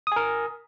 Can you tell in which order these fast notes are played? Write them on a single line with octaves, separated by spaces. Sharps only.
D#6 G#5 A#4